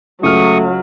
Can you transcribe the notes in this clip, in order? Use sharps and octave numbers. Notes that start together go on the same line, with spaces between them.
C#2 F#3 A3 C#6 D#6 F6